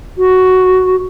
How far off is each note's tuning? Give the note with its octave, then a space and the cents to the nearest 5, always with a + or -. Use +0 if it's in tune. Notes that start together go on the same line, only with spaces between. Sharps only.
F#4 +5